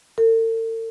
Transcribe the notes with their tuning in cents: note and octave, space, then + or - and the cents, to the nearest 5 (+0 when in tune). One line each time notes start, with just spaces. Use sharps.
A4 +45